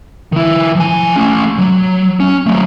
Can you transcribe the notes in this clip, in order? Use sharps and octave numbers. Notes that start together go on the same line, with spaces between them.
D#3 E4
F3 G#5
A3 C#4
F#3
C#4
F#3 A3